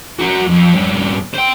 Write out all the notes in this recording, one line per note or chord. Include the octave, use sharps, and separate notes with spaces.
F#4 A#4
F2
G2 C#4
C5 G5